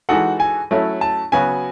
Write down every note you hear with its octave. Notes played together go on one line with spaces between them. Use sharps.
E3 G#3 D#4 F#4 A4 F#5
G#5
F#3 A3 C#4 E4 A4
A5
C#3 F#3 B3 F#4 G#5